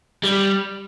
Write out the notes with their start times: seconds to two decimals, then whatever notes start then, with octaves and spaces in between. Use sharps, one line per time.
0.24 G3